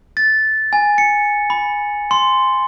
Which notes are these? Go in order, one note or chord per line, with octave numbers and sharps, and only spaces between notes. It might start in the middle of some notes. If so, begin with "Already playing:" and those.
A6
G#5
C#7
B5
C6